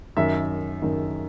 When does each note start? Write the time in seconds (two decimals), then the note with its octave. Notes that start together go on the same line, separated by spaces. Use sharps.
0.17 F#2 D#3 E5
0.82 F#2 D#3